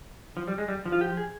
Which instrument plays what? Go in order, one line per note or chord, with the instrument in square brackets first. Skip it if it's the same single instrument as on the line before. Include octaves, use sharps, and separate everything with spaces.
[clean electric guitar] F3
G3
G#3
G3
F3
[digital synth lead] F4
G4
G#4